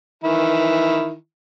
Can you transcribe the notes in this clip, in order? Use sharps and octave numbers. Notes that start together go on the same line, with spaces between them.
D#3 E3 E4